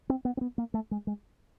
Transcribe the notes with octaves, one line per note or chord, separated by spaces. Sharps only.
C4
B3
C4
B3
A#3
A3
G#3
G#3